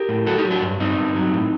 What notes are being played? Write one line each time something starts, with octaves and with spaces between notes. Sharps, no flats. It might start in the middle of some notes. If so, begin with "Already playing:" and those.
Already playing: G4 A#4
A2
F#3 F#4 A4
D#4 G4
F#3
D4 F#4
G2
G2 C4 D#4
G2
F#3
A2